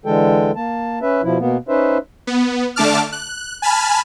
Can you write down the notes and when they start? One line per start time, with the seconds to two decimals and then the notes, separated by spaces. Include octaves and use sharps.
0.06 D3 E3 G#3 A4 G5
0.56 A#3 A5
1.02 C#4 B4 E5
1.23 B2 F3 E4
1.39 B2 A#3 B3
1.68 C#4 D#4 B4 C5 E5
2.27 B3
2.76 D3 A3 D4 A5 D6 F6
3.12 F#6
3.62 G#5 A5 B5 F6